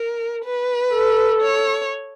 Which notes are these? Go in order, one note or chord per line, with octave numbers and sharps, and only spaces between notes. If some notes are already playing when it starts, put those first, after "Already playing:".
Already playing: A#4
B4
A4
C#5